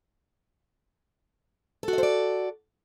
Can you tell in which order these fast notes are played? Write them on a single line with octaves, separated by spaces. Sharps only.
A4 F#4 D#5 C5 D5